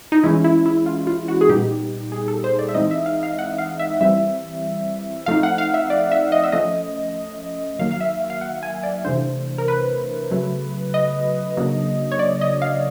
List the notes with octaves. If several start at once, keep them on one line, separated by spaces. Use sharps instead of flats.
D#4
E3 G#3 C#4 E4
E4
E4
F4
F4
F#4
G#4
A#2 G3 B3 D#4 G4
G#4
A4
C5
D5
E5
E3 G#3 C4 D#4 D#5
E5
F5
F5
F#5
F5
E5
E3 G3 C4 E5
F3 A3 C4 D#4 F5
F#5
F5
E5
D5
E5
D#5
E5
F3 A3 C#4 D#5
D#3 F#3 A#3 F5
F5
E5
F5
F#5
G#5
D5
C3 E3 A3 D4 C5
A#4
B4
C#3 F#3 A3
D#5
C#3 F#3 A#3 D4
C#5
D5
D#5
F5